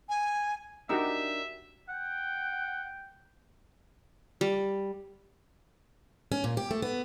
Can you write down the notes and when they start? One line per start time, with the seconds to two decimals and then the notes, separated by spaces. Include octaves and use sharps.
0.09 G#5
0.89 D4 D#4 F#4 G4 A#4 E5 E6
1.89 F#5 G5
4.41 G3
6.32 C#4
6.44 A#2
6.57 G4
6.71 A3
6.82 B3